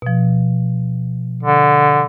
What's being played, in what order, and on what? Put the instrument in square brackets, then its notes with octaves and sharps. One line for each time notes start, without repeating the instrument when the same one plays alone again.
[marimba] B2 F3
[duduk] D3